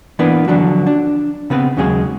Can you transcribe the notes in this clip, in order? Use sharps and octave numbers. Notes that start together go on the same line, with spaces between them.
E3 A#3 B3 D4 B4
D3 F3 F#3 D4 F#4
D4
C#3 B3 C4 B4
D#2 C#3 F#3 G#3 G#4